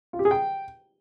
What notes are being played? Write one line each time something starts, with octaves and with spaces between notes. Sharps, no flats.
F4
G4
G#4
G5